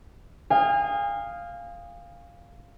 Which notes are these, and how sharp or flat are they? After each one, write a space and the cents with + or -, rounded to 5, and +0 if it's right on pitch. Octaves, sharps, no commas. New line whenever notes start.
F5 +0 G#5 -40 D#6 +0